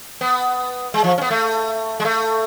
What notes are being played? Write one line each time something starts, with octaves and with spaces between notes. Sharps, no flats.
B3
G#3
F3
C#4
B3
A3
G#3
A3